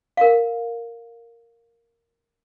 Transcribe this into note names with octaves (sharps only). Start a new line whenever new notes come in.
A#4 F5